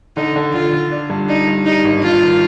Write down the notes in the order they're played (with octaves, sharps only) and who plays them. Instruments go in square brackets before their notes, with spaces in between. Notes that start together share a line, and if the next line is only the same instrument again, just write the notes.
[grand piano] D3 [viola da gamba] D#4
[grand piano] D3
[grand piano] D3 [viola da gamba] F4
[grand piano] D3
D4
G2
[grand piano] D4 [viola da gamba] D#4
[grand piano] G2
[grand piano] G3 [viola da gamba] D#4
[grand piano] G#1
[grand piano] G2 [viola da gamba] F4
[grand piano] D#3